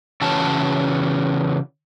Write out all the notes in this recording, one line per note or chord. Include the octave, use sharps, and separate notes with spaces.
C#3 E3 C#4 F#4 A5